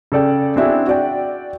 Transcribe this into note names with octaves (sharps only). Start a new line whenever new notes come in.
C#3 A4 D5 G5
C4 D4 E4 F#4 G#4
F#4 D5 G5